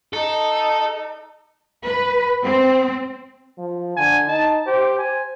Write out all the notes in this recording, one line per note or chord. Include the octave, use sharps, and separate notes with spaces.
D#4 A4
B4
C4
F3
D3 G#5
D#4 A5
G4 C5
C5 G#5